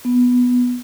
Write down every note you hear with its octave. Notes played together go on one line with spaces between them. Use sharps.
B3